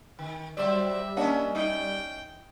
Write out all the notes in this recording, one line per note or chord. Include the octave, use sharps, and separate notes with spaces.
D#3
F#3 G3 C5 D5 E5
A#3 C#4 D4 D#5 F#5
D#4 E4 G5